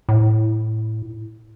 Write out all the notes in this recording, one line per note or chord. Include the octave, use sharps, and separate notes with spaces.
A2